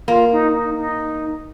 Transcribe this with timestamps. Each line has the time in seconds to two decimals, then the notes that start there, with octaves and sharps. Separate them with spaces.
0.08 A#3 F4
0.32 D#4
0.54 D#4
0.77 D#4